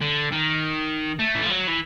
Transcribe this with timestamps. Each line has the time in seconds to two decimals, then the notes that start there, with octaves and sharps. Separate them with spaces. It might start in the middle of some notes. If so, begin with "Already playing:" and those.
0.01 D3
0.32 D#3
1.19 A3
1.35 E3
1.43 F3
1.50 F#3
1.68 E3